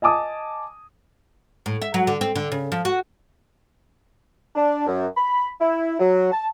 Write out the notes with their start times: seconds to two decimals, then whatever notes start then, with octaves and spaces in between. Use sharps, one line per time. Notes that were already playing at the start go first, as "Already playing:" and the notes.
0.02 D#5 G#5 A5 D6 D#6
1.66 A2
1.82 E5
1.94 F#3
2.07 D3
2.21 C4
2.36 D3
2.52 C#3
2.72 F3
2.85 F#4
4.56 D4
4.87 F#2
5.17 B5
5.60 E4
6.00 F#3
6.32 A5